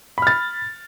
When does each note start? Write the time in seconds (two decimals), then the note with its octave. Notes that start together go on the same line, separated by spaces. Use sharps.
0.18 B5
0.22 F6
0.27 A6